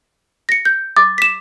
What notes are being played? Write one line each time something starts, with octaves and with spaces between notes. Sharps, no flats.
A#6 C#7
G6
D6 A6
B6 E7